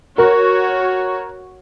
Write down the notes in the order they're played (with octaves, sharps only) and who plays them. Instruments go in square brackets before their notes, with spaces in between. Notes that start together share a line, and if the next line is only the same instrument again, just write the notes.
[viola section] F#4 C#5 [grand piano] A#4